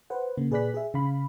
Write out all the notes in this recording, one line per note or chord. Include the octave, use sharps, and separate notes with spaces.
B4 C5 F#5
C#3 A#3
A#2 G#4 B4 D5 F#6 B6
G#4 E5
C#3 F5 B5